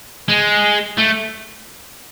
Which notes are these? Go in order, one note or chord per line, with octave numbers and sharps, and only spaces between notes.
G#3
A3